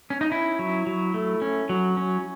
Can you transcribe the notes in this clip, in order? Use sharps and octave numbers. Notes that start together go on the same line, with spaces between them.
C#4
D#4
C#4 E4
F#3
F#3
A3
C#4
F#3
C#4